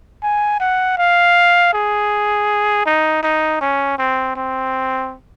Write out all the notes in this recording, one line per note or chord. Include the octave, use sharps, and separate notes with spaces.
G#5
F#5
F5
G#4
D#4
D#4
C#4
C4
C4